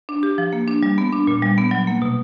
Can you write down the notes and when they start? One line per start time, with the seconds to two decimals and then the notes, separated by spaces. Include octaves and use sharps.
0.09 D4
0.23 G4
0.38 F3
0.53 A#3
0.68 D4
0.83 G3
0.98 B3
1.13 D4
1.27 A#2
1.43 G3
1.58 B3
1.71 F#3
1.87 A#3
2.02 B2